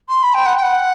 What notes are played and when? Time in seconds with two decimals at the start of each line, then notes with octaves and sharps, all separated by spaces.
0.09 C6
0.23 B5
0.34 G5
0.46 F#5
0.57 G5
0.62 F#5